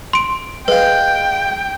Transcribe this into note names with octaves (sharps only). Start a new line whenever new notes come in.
C6 D7
G#3 B4 F5 G5